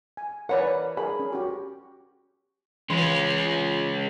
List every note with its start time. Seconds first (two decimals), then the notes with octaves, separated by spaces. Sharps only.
0.17 G#5
0.49 E3 A#4 B4 C#5 D5 F#5
0.97 G#4 A#4 B5
1.20 C#4
1.32 F#4 G4
2.90 E3 G#3 C#4 B5